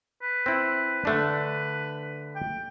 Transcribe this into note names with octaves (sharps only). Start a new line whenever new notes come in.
B4
C4 E4
D3 A3 D4
G5